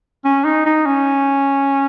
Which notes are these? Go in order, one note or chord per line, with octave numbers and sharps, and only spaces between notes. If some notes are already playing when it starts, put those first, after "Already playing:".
C#4
D#4
D#4
C#4